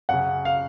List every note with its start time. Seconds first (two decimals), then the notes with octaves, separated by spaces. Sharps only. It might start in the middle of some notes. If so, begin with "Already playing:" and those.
0.09 F#2 C#3 F#5
0.45 F5